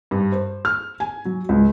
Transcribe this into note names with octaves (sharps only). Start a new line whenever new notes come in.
G2
C5
F6
G#5
F#3
C#2